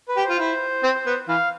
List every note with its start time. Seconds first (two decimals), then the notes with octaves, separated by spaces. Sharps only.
0.09 B4
0.17 G4
0.24 C5
0.30 F4
0.39 E4
0.83 C4
1.06 B3
1.29 E3 F5